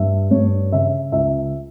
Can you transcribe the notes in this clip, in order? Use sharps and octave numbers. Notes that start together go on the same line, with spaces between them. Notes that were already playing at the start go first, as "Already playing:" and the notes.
Already playing: G2 E5
G2 C#5
C#3 E5
C#2 E5